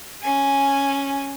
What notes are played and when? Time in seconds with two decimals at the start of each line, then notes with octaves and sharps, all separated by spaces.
0.22 C#4 G#5